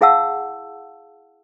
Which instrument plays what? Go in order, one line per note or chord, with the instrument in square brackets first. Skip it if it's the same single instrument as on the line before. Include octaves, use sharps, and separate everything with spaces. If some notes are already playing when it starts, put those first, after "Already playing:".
[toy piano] E4 G#4 F5 F#5 A5 E6